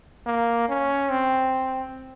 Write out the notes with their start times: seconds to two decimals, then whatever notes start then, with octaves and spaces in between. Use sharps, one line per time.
0.26 A#3
0.69 C#4
1.10 C4